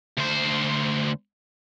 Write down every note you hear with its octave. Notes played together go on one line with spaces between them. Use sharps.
D2 C5